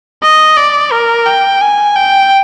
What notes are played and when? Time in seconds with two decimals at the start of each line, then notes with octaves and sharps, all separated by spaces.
0.23 D#5
0.57 D5
0.92 A#4
1.26 G5
1.61 G#5
1.96 G5